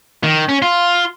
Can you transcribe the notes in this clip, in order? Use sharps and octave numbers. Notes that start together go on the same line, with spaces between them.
D#3
C#4
F4